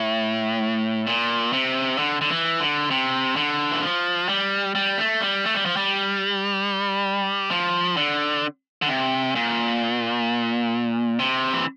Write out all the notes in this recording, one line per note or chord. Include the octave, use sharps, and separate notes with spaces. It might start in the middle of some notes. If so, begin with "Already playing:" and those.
Already playing: A2
A#2
C3
D3
D3
E3
D3
C3
D3
E3
F3
G3
G3
A3
G3
A3
G3
F3
G3
F3
D3
D3
C3
A#2
C3
E3